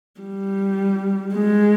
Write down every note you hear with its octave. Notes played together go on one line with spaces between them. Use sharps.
G3
G#3